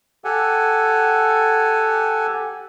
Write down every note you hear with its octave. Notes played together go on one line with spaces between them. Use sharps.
G4 A4 F#5 G#5